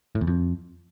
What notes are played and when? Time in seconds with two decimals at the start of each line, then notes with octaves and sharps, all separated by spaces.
0.15 A2
0.21 E2
0.27 F2